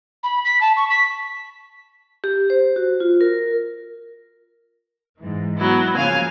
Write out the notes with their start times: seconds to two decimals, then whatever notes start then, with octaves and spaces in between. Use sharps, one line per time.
0.24 B5
0.45 B6
0.61 A5
0.77 C#6
0.90 B6
2.24 G4
2.50 C5
2.76 F#4
3.00 F4
3.21 A#4
5.21 G#2 E3
5.58 F#3 B3 E4
5.96 C#3 F3 A#3 F5 G#5